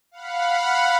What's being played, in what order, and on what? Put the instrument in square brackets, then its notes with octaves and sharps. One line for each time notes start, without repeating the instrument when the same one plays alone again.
[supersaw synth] F5 F#5 B5